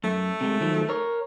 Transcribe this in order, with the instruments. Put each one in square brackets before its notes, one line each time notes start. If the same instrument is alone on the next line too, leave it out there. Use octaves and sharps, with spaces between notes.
[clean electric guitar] F#2 [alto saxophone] A3
[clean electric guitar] C3 G#3
D#3 F3 F#3
A#4 C#5